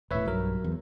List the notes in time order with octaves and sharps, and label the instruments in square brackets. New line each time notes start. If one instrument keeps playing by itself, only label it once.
[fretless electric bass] E1 A2 [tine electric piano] B4 C#5 E5
[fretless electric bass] B1 G2 [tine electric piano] F#3 A#4
[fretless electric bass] E2